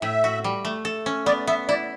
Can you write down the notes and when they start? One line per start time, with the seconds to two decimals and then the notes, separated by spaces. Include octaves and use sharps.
0.02 A2 E5
0.24 F#4
0.44 G3
0.65 A3
0.85 A4
1.06 C#4
1.26 B3 D5
1.47 B3 E5
1.68 E4 D5